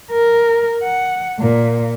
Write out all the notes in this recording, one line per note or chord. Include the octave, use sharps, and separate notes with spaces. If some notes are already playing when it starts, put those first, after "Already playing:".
A#4
F#5
A#2